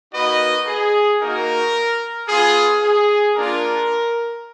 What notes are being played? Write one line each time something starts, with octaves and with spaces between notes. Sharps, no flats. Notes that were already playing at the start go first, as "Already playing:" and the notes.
A#3 D#4 F#4 B4 D#5
G#4
A#3 D#4 F#4 A#4
B3 F4 G#4
G#4
A#3 D4 F4 A#4